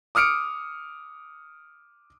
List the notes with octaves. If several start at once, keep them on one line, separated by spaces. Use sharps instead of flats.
D6 D#6 F6 C#7 D7